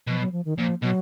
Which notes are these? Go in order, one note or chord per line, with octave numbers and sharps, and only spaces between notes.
B2 F3
F#3
F3
D#3
A#2 F3
B2 F#3